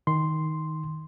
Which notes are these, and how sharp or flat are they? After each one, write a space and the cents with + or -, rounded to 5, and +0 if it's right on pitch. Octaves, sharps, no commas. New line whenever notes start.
D#3 +10 C6 +0